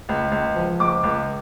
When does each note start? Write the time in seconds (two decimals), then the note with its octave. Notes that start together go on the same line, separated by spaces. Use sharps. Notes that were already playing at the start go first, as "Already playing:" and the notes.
0.09 C#2
0.32 C#2
0.56 F3
0.79 C#2 D6
1.03 C#2